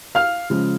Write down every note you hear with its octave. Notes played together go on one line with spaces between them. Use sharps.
F5 F6
C#3 F3 G#3